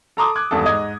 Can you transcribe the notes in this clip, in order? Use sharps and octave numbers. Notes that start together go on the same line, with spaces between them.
A4 A5 A#5 C6 D6 D#6
D6 F#6 G#6
G#1 E2 G2 A4
G#2 D#5 D#6 G#6